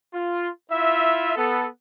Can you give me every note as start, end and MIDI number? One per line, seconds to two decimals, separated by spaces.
0.14 0.49 65
0.71 1.33 64
0.71 1.33 65
0.71 1.33 76
1.36 1.67 59
1.36 1.67 69